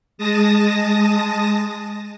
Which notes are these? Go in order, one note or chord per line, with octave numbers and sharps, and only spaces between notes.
G#3 A5 D#6 A#6